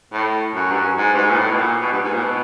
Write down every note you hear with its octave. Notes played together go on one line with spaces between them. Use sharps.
A2
F#2
G2
F#2
G#2
G2
G#2
A#2
A2
B2
A#2
B2
G2
G#2
A#2
B2